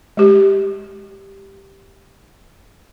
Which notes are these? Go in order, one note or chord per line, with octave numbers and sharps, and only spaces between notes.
G#3 G4